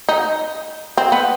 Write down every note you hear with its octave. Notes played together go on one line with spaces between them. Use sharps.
D#4
C4
B3